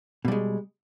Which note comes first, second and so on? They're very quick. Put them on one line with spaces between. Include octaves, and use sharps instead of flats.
B2 G3 G#3